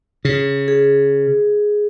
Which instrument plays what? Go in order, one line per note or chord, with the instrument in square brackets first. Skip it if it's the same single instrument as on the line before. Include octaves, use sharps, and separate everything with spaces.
[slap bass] C#3
[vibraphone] G#4